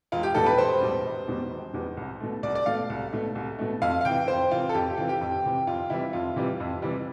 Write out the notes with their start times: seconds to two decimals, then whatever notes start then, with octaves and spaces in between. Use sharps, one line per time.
0.12 E1 F4
0.23 G4
0.35 E2 B2 G3 A4
0.46 B4
0.58 E1 C5
0.81 E2 B2 G3
1.05 E1
1.28 E2 B2 G3
1.51 E1
1.73 E2 B2 G3
1.97 C2
2.20 B2 A3
2.43 C2 D5
2.55 D5
2.66 B2 A3 F5
2.90 C2
3.13 B2 A3
3.35 C2
3.59 B2 A3
3.82 F2 F5
4.01 F5
4.05 C3 E3 G5
4.28 F2 C5
4.51 C3 E3 F4
4.69 A4
4.74 F2 G4
4.90 G4
4.97 C3 E3 F4
5.09 G4
5.21 F2
5.44 C3 E3
5.67 F2 F4
5.90 C3 E3 G3 E4
6.13 F2 F4
6.36 C3 E3 G3
6.60 F2
6.82 C3 E3 G3